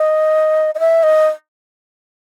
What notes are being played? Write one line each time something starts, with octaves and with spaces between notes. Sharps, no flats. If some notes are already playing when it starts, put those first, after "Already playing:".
Already playing: D#5
D#5
E5
D#5